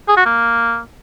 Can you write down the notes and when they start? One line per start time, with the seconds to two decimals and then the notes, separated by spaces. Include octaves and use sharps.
0.09 G#4
0.17 F#4
0.26 A#3